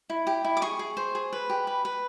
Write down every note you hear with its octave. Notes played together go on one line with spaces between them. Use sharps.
E4
G4
E4
D6
G#4 C#6
G#4
C5
G#4
B4
G4
B4
B4